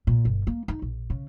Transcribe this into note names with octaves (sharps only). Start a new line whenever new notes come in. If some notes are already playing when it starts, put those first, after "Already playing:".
A#2
G1
A#3
D#4
A#1
C#3